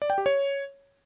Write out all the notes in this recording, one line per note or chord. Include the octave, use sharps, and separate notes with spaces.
D5
G5
G4
C#5